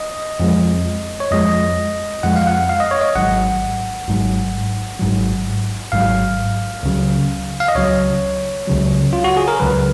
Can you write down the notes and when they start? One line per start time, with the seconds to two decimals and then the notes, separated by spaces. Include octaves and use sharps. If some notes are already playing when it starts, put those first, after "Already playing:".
Already playing: D#5
0.40 F2 F3 G#3
1.20 C#5
1.31 F2 F3 G#3 D#5
2.23 F2 F3 G#3 F#5
2.36 F5
2.47 F#5
2.69 F5
2.80 D#5
2.91 C#5
3.01 D#5
3.15 G#1 G#2 F#3 F#5
4.08 G#1 G#2 F#3
4.99 G#1 G#2 F#3
5.92 G#1 G#2 F#3 F5
6.83 C#2 C#3 F#3
7.60 F5
7.68 D#5
7.76 C#2 C#3 F#3 C#5
8.68 C#2 C#3 F#3
9.13 F4
9.24 F#4
9.37 G#4
9.48 A#4
9.60 C#2 C#3 F#3 B4